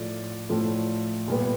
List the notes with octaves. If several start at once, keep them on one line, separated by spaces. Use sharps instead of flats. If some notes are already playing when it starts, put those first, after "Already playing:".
Already playing: A2 F3 A3 D5
A2 F3 A3
A#2 G3 B3